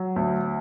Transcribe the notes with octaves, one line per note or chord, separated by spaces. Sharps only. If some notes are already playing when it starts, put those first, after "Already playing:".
Already playing: F#3
D2